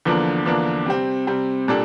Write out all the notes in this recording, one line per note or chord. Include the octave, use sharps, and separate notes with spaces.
E2 D3 F3 A#3 D4
E2 D3 F3 A#3 D4
C3 G3 C4
C3 G3 C4
A#2 G3 D4 A4